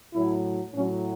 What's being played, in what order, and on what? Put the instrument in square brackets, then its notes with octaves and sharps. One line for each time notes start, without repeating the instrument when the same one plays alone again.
[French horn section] A2 F#3 E4
A2 F#3 C#4